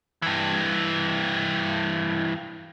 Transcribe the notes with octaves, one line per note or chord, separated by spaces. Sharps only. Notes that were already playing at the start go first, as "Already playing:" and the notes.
G2 E3